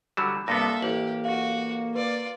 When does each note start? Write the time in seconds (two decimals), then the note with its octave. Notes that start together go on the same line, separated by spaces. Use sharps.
0.17 D3 F#3 G3 B5 E6 E7
0.48 G2 C3 A#3 B3 A4 E5 A#6
0.82 A1 G4 F#7
1.25 F#4 F5
1.95 F4 B4 D5